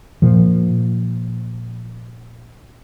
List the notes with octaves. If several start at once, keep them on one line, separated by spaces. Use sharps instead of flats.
A#2 F3